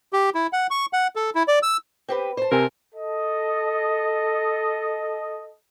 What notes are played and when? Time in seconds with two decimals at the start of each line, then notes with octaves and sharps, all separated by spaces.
0.13 G4
0.35 E4
0.53 F#5
0.71 C#6
0.93 F#5
1.16 A4
1.35 E4
1.48 D5
1.63 E6
2.09 C4 G4 B4
2.37 C5 A5
2.51 C3 C4 A#4 G#5
2.95 A4 D#5